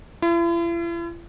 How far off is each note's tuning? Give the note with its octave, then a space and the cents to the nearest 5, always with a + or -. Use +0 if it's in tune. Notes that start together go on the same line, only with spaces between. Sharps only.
E4 +45